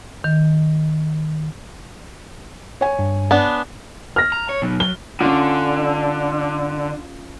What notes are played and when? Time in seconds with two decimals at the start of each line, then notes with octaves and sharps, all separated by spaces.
0.24 D#3
2.81 C#5 G#5
2.99 G2
3.31 B3 D4
4.16 F6 A#6
4.32 A#5
4.49 C#5
4.62 B2 F#3
4.80 F#3 G7
5.21 D3 C#4 F4